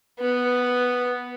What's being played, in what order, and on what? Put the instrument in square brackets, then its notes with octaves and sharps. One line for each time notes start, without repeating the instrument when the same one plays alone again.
[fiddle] B3